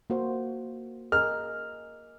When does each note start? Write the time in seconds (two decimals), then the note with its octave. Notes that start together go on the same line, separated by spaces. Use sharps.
0.10 A#3 F#4 C5
1.12 G#4 A#4 D#5 F6